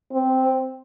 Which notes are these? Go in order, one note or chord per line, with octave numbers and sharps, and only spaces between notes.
C4